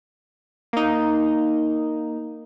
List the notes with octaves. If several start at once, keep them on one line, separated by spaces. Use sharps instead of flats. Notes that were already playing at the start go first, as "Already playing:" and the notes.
A#3 D#4